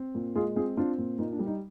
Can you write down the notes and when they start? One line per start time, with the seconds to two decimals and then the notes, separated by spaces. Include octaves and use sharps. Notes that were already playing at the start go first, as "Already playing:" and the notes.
Already playing: C4
0.15 A#2
0.35 G#3 F4 G#4
0.56 C4 F4 G#4
0.77 C4 D4 F4
0.98 A#2
1.19 A#2 D#4
1.33 D4
1.39 G3
1.46 D#4